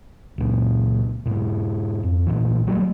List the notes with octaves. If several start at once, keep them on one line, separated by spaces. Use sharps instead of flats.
C#2 A#2
G#2 B2
F2
A#1 A#2 E3
F#3 G3 A3